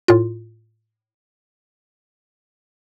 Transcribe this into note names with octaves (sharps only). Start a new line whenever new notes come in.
A2 F4